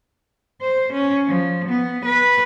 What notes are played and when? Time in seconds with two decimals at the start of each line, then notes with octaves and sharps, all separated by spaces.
0.61 C5
0.93 C#4
1.27 F3
1.69 B3
2.05 B4